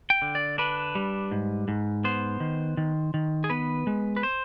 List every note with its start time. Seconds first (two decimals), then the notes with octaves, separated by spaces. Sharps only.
0.10 G5
0.22 D3
0.35 D5
0.58 D4 B4
0.95 G3
1.31 G#2
1.68 G#2
2.04 B3 C5
2.40 D#3
2.77 D#3
3.14 D#3
3.44 G#4
3.50 B3 B4
3.87 G#3
4.17 B4
4.23 C5